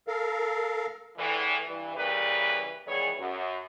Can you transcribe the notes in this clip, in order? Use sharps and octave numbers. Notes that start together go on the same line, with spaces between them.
A4 A#4 F5
E2 A2 D3 E3
G2 E3
C#3 E3 G3 A#3 G4 B4
D#3 E3 G3 B3 G#4 C#5
F#2